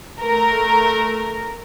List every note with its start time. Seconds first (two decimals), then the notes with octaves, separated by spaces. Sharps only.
0.22 A3 A#4